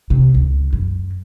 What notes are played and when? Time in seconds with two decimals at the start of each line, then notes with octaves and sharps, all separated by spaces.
0.10 C3
0.35 C#2
0.73 F#2